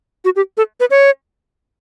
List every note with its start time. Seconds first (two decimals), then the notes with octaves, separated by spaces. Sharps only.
0.25 F#4
0.36 G4
0.57 A4
0.80 B4
0.91 C#5